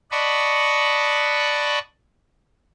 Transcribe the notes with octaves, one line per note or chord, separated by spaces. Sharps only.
D5 D#5 F#5 A5 B5 C#6